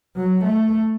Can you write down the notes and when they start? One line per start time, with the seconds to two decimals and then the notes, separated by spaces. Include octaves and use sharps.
0.16 F#3
0.44 A3